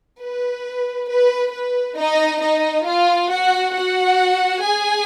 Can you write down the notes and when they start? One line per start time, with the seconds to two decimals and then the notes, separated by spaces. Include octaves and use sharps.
0.21 B4
1.09 B4
1.53 B4
1.98 D#4 D#5
2.42 D#4 D#5
2.86 F4 F5
3.30 F#4 F#5
3.75 F#4 F#5
4.63 G#4 G#5